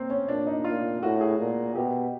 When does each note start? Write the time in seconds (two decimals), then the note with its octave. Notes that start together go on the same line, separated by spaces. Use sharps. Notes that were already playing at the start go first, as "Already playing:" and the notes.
Already playing: A#3 C4
0.10 C#4
0.28 A#2 D4
0.47 D#4
0.64 A#2 F4
1.02 A2 F#4
1.21 G#4
1.39 A#2
1.75 B2 G4